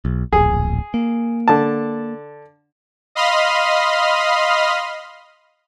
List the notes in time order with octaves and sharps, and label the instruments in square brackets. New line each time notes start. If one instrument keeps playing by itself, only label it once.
[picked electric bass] B1
[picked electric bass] D1 A#1 [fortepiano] G#4
[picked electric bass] A#3
[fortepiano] D3 A5
[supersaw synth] D#5 F5 B5 C6 D#6 F6